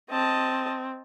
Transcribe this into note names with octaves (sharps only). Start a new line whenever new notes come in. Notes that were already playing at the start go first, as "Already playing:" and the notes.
C4 D#5 A5